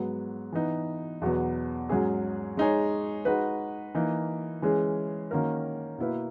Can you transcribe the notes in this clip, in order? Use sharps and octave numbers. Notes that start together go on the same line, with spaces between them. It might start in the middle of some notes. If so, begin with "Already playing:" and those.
Already playing: G#2 F#3 B3
E3 B3 D#4
E2 B2 F#3 B3
G#2 F#3 C#4 G#4
G#3 D#4 G#4 C#5
G#3 D#4 F#4 B4
E3 A#3 D#4
E3 G#3 C#4 G#4
D#3 A#3 C#4 F#4 A#4
B2 A#3 E4 B4